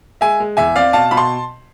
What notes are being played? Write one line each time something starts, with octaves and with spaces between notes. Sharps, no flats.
G#3 E5 G#5
G#3
E2 E5 G#5
C4 D5 F5
B2 F5 A5
B2 B5
A5 C6